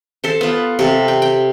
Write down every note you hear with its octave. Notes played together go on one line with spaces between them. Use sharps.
A4 C5
B3 F4
C3 A4
G5
G5